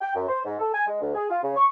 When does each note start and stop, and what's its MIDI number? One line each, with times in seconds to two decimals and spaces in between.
0.01 0.13 79
0.15 0.28 42
0.28 0.40 72
0.45 0.57 44
0.59 0.69 69
0.74 0.83 80
0.87 0.99 56
1.01 1.11 38
1.15 1.28 68
1.30 1.40 65
1.43 1.52 49
1.57 1.66 85